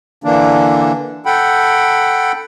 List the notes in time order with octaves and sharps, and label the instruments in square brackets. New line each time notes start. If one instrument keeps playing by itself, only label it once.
[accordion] D3 E3 A#3 D4
A4 F#5 G5 B5